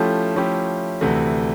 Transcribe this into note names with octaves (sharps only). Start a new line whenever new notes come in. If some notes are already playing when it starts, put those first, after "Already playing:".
Already playing: F3 A3 C#4 E4 G4
F3 A3 C#4 E4 G4
D2 C3 E3 A3